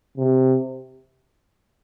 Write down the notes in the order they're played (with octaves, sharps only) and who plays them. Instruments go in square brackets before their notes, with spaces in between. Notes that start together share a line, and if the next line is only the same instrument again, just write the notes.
[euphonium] C3